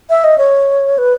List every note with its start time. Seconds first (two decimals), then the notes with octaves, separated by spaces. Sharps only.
0.10 E5
0.24 D#5
0.38 C#5
0.98 B4